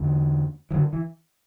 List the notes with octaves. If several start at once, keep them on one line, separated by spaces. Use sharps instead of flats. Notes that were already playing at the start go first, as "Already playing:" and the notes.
Already playing: E2 D3
E3
D3 F#3
E3